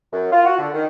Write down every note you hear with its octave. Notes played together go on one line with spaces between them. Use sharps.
F#2
F4
F#4
D3
D#3